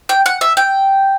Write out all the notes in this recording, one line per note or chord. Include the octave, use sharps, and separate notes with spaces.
G5
F#5
E5
G5